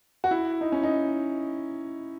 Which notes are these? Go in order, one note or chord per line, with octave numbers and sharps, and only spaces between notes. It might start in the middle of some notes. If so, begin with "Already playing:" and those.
F#4
E4
D#4
C#4
D#4